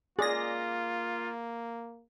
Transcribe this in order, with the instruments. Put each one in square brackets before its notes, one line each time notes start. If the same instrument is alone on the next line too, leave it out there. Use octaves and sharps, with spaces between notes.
[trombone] A#3 [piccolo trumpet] F4 [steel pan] G#4 [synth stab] D5 A#6